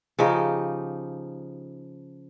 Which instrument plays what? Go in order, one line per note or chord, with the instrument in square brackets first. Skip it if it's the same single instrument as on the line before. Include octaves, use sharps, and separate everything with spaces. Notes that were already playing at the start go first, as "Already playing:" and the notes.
[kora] C#3 F3 D#4 G4